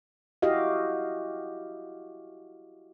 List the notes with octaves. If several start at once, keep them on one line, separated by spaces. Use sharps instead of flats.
E4 F#4 G4 D#5 F5